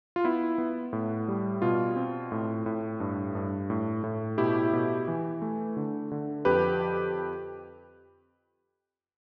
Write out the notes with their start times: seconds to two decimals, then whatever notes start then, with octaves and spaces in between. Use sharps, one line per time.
0.16 F4
0.24 B3 E4
0.58 B3
0.93 A2
1.28 G3
1.62 B2 F4
1.96 C4
2.32 A2
2.66 A2
3.00 G2
3.35 G2
3.70 A2
4.04 A2
4.38 B2 E4 G4
4.73 B2
5.08 E3
5.42 A3
5.77 D3
6.11 D3
6.45 F2 G4 B4